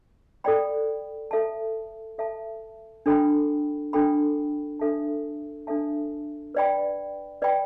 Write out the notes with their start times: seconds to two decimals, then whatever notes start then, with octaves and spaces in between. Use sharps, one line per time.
0.44 A4 D5 G5 B5
1.31 A4 E5 A5
2.18 A4 E5 A5
3.06 D4 A4 G5 B5
3.93 D4 A4 G5 B5
4.80 D4 A4 E5 A5
5.67 D4 A4 E5 A5
6.55 B4 D5 G5 B5
7.42 B4 D5 G5 B5